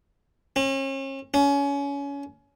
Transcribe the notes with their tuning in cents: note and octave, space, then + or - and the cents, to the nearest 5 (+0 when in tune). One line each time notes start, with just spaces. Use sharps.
C#4 -40
C#4 +25